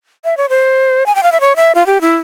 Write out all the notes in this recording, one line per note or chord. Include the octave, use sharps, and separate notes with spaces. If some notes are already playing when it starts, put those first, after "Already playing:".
E5
C#5
C5
G#5
G5
F5
E5
C#5
E5
F4
G4
E4